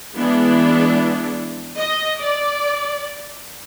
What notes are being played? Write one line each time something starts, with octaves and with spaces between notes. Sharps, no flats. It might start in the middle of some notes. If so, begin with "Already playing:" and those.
E3 G#3 B3 D4
D#5
D5